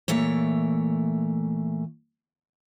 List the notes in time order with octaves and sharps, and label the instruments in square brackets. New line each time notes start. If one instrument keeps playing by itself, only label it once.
[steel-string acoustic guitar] A#2 E3 A3 C#5